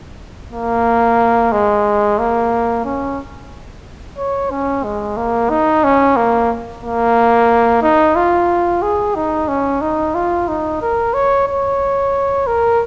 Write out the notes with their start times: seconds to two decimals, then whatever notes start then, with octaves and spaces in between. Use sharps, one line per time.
0.52 A#3
1.52 G#3
2.19 A#3
2.85 C#4
4.18 C#5
4.51 C#4
4.84 G#3
5.17 A#3
5.50 D#4
5.84 C#4
6.16 A#3
6.83 A#3
7.82 D#4
8.15 F4
8.82 G#4
9.15 D#4
9.48 C#4
9.81 D#4
10.15 F4
10.48 D#4
10.81 A#4
11.14 C#5
11.48 C#5
12.47 A#4